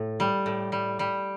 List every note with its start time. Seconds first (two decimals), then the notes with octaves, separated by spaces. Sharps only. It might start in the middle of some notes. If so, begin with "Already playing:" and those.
Already playing: A2
0.20 G3
0.46 A2
0.72 G3
0.99 G3